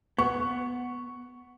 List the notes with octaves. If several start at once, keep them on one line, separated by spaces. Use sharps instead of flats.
B3 C#6